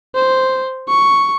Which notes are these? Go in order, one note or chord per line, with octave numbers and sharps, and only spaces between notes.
C5
C#6